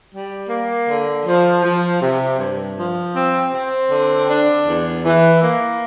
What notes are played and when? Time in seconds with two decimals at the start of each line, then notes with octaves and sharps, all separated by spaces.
0.12 G3
0.49 A#3
0.87 D3
1.25 F3
1.63 F3
2.01 C3
2.38 G2
2.77 F3
3.14 C4
3.51 C4
3.89 D3
4.28 D4
4.65 E2
5.04 E3
5.41 A#3